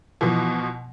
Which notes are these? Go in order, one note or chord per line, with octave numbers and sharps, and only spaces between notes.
B2 E3 F3